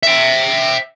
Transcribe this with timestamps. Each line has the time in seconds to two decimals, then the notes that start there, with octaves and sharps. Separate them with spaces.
0.03 E5 G5